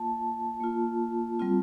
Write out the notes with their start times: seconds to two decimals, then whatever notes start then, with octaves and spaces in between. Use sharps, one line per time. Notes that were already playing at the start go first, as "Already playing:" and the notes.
Already playing: A#3 F4 A5
0.60 A#3 F4
1.39 G3 C4 F4